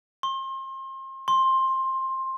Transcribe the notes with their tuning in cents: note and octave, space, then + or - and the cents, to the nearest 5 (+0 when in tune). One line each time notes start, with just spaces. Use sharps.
C6 +35
C6 +15